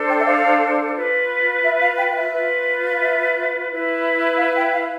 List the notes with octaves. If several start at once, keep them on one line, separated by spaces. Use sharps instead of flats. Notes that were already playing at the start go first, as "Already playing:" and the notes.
Already playing: D4 A4 C5
G5
E5
F5
F4 B4
E5
F5
G5
F5
E5
F4 B4
F5
E5
E4 B4
F5
G5
F5